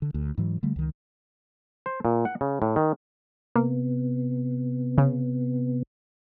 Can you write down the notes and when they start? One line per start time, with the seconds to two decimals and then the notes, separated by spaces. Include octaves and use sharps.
0.02 D3
0.14 D2
0.38 G#2 E3 F#3
0.63 D3 G3 A3
0.76 C#2 D#3
1.86 C5
2.05 A#2
2.25 F#5
2.41 C#3
2.62 A2
2.76 D#3
3.56 C3 A#3 B3
4.98 C#3